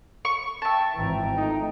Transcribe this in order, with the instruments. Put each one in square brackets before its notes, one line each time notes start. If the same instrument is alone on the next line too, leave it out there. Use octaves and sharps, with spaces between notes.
[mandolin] C#6
[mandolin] E5 A5 [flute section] G5 C#6
[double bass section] G#1 E3 F3 [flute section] G5 A#5
[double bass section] A3 [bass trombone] D#4